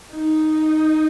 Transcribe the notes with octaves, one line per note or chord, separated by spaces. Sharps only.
D#4